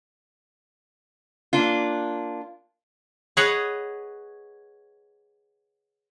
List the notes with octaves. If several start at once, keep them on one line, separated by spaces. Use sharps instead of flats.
A#3 D4 F4
G#4 B4 C#5 D#5 F#5